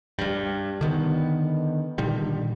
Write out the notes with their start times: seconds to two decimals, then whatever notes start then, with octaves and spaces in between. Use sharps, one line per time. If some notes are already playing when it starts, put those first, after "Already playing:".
0.19 G2 G3
0.81 D3 D#3 B3
1.98 A#2 D3 D#3 G3